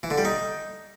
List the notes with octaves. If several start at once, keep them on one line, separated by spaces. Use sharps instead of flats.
E3
D3
G3
D#4